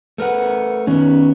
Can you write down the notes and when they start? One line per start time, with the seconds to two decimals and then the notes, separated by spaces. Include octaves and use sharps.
0.18 A3 A#4 B4 F#5
0.87 D#3 B3 C#4